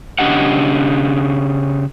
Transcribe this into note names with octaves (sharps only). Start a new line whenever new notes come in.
C#3 D4 G4 D#5 F#5